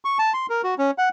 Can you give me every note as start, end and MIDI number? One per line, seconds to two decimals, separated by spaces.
0.05 0.18 85
0.19 0.33 81
0.34 0.46 84
0.50 0.62 70
0.64 0.75 66
0.78 0.91 61
0.98 1.09 78